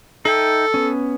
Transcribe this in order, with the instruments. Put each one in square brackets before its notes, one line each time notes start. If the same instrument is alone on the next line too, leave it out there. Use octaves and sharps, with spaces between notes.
[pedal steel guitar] D#4 E5 G5 [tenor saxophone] A4
[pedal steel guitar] B3 C#4